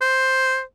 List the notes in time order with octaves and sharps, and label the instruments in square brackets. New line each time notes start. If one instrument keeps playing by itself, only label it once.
[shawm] C5